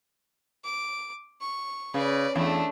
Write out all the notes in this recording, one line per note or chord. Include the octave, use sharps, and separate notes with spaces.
D6
C#6
C#3 B4 D5
E2 A3 D4